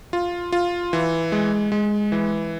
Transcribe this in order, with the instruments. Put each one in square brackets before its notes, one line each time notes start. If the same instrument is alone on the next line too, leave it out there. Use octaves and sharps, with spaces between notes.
[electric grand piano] F4
F4
E3
G#3
G#3
E3